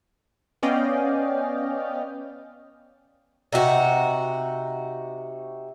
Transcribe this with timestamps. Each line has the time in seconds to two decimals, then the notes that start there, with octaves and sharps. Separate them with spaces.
0.63 B3 C#4 D5 D#5 F5 G5
3.52 C3 D#4 F#4